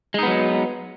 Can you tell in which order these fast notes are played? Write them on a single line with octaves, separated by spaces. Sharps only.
G#3 D#4 B3 F#3